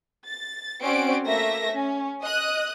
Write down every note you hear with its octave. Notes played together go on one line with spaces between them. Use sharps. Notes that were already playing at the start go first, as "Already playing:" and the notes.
A6
C4 C#4 F#4 D5 D7
A3 A#3 E5 A#6
C#4
D#5 D#6 F#6